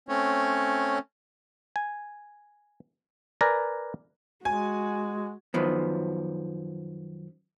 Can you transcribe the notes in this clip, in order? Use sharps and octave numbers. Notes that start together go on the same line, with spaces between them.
A3 C4 C#4 C#5
G#5
A#4 B4 D5 G#5 A#5
G#3 F#4 G#5
F#2 D#3 F3 B3